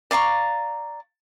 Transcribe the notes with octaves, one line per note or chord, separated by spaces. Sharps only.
D5 F5 A#5 C#6